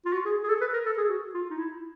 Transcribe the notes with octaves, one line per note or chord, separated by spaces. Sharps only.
F4
F#4
G#4
G#4
A4
B4
A#4
A4
G#4
F#4
F4
D#4
E4